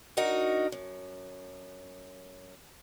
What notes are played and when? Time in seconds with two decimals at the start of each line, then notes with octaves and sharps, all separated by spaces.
0.17 D4 D#4 F#4 A#4 D#5
0.72 F#2